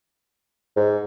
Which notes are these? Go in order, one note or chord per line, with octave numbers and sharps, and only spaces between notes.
G#2